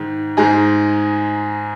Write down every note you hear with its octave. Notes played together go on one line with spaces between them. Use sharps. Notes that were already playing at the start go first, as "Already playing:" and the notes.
Already playing: G#2 D#3
G#2 G#3 D#4 G#4